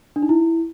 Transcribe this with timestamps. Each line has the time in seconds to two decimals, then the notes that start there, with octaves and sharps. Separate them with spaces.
0.16 D4
0.23 D#4
0.29 E4